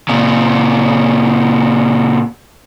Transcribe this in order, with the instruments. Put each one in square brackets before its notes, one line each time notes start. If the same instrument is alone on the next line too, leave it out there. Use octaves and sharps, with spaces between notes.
[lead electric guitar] A#2 C#3